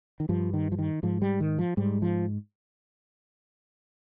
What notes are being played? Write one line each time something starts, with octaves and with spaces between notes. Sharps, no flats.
D#3
G2 F3
D#3
F3
D#3
G#2 F3
G3
D#3
F3
G#2 G3
F3